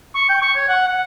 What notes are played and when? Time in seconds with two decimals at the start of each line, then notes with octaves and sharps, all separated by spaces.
0.15 C#6
0.29 G5
0.42 C#6
0.56 C#5
0.68 F#5
0.88 F#5